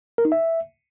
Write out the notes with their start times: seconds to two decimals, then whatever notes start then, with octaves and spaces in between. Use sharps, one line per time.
0.18 A#4
0.25 D#4
0.32 E5